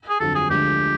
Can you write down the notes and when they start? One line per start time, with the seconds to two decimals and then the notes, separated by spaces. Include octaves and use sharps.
0.09 G#4
0.20 G1 F2 D3 F#3 A4
0.35 G#4
0.50 D2 D3 F3 G#3 G4